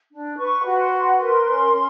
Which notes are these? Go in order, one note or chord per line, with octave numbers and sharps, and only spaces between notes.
D4
B4 C#6
F#4
C6
B4
A#4 C6
C#4
C#4